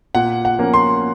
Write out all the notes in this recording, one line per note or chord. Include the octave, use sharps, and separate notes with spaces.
A#2 F#5
F#5
F3 A#3 C#4
C6